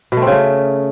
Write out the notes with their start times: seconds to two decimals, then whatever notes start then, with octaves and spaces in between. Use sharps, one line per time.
0.12 B2
0.17 A3
0.22 C4
0.27 C#3
0.32 A3